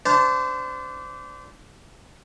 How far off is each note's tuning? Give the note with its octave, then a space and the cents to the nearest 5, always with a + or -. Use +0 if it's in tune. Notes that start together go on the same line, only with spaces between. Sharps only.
D4 -20 C5 -30 A5 +0